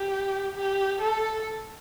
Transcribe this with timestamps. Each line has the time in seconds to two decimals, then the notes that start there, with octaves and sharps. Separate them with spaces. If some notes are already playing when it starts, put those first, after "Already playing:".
Already playing: G4
0.55 G4
1.01 A4